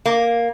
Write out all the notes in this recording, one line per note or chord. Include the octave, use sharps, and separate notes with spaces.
A#3